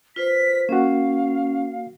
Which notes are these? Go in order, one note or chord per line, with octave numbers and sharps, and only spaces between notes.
F4 B4 C5 B6
A#3 C#4 F#4 F5